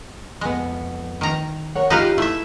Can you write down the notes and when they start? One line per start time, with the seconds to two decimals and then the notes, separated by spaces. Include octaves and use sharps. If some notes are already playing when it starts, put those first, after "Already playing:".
0.41 F2 G#3 B3
1.21 D#3 A#5
1.76 A#4 C#5 F#5
1.90 G#3 D#4 F4 G4 B4 F5
2.18 A3 E4 E5